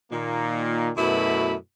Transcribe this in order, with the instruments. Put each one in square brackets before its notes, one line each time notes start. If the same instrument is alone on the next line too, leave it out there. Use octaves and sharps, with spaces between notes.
[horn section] A#2 D#3 A#3
F#2 B2 A3 E4 B4 B5